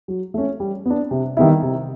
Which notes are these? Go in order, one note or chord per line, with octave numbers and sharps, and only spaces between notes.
F#3
A3 C#4
G3
B3 D4
C3
D#3 G3 B3 E4
C3